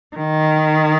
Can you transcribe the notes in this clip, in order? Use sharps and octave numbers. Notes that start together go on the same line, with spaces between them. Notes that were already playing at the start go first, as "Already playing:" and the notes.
D#3